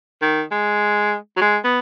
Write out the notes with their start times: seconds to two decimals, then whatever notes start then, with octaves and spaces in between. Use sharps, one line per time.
0.22 D#3
0.51 G#3
1.37 F#3
1.41 G#3
1.64 B3